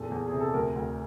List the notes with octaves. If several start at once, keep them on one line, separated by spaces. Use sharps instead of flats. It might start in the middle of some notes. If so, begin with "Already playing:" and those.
Already playing: E2 A#2 A4
E2
G#4
C3
A4
D2 A#4
D2